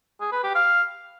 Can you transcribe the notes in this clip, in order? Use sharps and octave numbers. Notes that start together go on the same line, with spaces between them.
G#4
B4
G4
F5